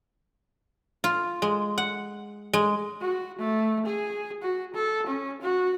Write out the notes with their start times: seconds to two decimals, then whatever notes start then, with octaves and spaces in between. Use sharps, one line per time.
1.04 F4
1.42 G#3
1.78 F#5
2.53 G#3
3.01 F#4
3.39 A3
3.86 G#4
4.43 F#4
4.74 A4
5.07 C#4
5.41 F#4